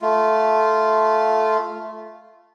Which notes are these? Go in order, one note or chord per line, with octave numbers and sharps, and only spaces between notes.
A3 F4